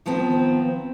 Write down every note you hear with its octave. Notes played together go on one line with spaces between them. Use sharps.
D#3 F3 B3 C4